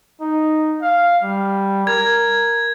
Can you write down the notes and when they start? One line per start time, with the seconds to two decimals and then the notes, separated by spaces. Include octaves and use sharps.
0.21 D#4
0.82 F5
1.23 G3
1.87 A#4 G#6